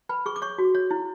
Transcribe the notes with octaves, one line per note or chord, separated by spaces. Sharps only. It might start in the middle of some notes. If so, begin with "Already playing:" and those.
B4 B5
G#4 C#6
D6
C#5 C#6
F#4
C#5
E4